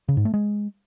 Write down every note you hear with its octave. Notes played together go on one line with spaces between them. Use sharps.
C#3
G#2
A3
G#3